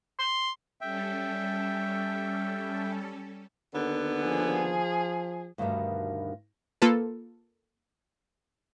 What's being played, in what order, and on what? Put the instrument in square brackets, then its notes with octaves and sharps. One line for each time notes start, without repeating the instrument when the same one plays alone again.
[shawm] C6
[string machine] G3 C#4 A4 [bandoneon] E5 G5
[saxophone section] D#2 D3 B3
[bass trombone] F3 [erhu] G#4
[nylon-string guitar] D2 G2 B2 D#3 G3 A#4
[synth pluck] A#3 F4 A4 B4